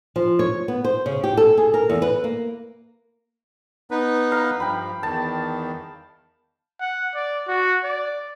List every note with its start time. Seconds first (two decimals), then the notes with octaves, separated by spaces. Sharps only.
0.16 F3
0.39 C#5
0.68 B3
0.85 C5
1.06 C#3
1.24 G4
1.37 A4
1.58 G#4
1.74 A#4
1.90 E2
2.02 B4
2.24 A#3
3.91 B3 D#4 B4
4.32 F5 A#5
4.60 G2 F3 G5 B5
5.03 E2 D#3 A5
6.80 F#5
7.14 D5
7.48 F#4
7.84 D5